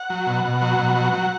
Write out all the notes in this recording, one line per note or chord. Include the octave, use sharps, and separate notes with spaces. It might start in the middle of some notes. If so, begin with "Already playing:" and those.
Already playing: F#5
F#3
B2
B2
F#3
B2
F#3
F#3